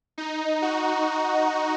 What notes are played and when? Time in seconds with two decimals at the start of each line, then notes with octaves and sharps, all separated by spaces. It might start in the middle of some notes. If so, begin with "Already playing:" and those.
0.18 D#4
0.62 F#4